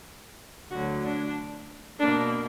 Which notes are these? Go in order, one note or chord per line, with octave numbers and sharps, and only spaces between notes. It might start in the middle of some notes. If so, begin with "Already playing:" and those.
D2 D3 F#3 F#4
D4
B2 A#3 D4